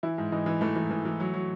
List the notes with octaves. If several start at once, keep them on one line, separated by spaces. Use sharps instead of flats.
E3 E4
G#2
E3 D#4
E3
E3 A3
E3
E3
E3
F#3
F#3